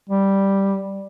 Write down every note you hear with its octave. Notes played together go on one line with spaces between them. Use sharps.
G3